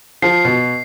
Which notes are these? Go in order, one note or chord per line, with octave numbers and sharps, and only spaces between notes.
F3 C7
B2